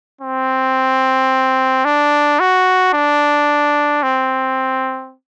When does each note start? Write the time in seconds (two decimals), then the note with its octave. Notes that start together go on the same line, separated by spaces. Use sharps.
0.21 C4
1.85 D4
2.40 F#4
2.94 D4
4.03 C4